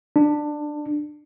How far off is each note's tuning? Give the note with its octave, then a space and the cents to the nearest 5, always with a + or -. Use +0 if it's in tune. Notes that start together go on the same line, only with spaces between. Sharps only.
D4 +15